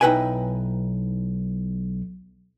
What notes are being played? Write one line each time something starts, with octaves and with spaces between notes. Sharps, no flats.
B1 D#4 E4 B4 G5 G#5